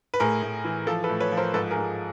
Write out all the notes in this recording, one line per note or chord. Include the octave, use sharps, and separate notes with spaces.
B4
A2 G#4 A#4
A2
E3
F3 A4
A4 B4
A2
B4 C#5
F3
A#4 C5
G#2 A4 B4
G#4 A#4
G#2